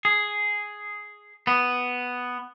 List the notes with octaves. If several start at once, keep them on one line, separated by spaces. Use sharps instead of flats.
G#4
B3